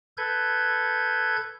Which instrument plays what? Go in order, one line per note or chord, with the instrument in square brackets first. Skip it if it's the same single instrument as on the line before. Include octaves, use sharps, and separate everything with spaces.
[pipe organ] A4 B4 G6 G#6